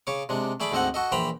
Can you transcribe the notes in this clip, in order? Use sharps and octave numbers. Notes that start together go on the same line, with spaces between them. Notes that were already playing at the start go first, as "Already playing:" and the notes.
C#3 C#5 D6
C3 G#3 D4
A3 G#4 D5 B5 D6
D2 G#2 C4 A4 D#5 F#5
F#4 A4 D#5
A#1 E3 C5 G5 A#5 B5